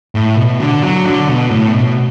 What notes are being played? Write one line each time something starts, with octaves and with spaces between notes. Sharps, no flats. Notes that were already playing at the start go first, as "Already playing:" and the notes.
A2
B2
D3
F#3
D3
B2
A2
B2